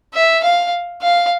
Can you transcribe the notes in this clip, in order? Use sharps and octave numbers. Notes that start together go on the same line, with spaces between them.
E5
F5
F5